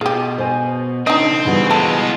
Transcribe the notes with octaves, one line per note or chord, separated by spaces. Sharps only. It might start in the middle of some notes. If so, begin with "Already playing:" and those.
B2 F4 G4 G#4
C5 G#5
C#3 C4 D4 D#4 D#5
C#3 E3 G3 B3 F#4
G#3 F4 A4